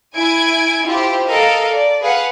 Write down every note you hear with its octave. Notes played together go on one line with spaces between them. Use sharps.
E4 G#5 G#6 D7
E4 F4 G4 C5
A4 A#4 D#5 F5
D5
G#4 B4 F5 F#5